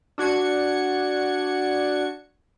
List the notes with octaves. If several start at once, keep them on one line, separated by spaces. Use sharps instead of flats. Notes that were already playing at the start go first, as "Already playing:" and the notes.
D4 F#4 G#6 C#7